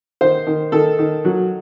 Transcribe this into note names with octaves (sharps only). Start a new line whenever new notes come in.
D#3 C5
D#3
D#3 A4
D#3
F#3